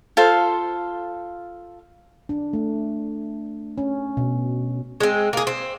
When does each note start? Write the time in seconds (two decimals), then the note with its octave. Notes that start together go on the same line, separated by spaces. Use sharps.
0.17 F4 A4 C5 F5
2.29 D4
2.53 A3
3.78 C#4
4.17 B2
5.00 G#3 C4
5.33 A#3 G#4
5.47 C4